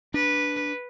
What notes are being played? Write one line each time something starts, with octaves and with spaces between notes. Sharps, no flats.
D4 B4